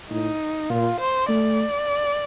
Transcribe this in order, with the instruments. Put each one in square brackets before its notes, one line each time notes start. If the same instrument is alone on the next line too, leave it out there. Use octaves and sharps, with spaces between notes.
[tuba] A2 [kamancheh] D#4
[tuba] A#2 [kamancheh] F4
[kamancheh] C5
[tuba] A3 [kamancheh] D5